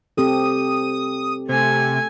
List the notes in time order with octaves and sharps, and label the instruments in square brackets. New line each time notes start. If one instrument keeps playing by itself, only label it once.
[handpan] C4 G4 A4 [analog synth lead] D#6
[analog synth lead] C3 [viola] A3 G#5